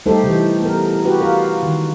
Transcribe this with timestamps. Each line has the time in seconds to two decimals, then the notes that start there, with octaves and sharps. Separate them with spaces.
0.06 G3 A3 D#4 G4 A4 C5
0.23 C3 E3
0.61 B3 A#4
1.04 F#4 G4 B4
1.21 F4 A#4
1.63 D#3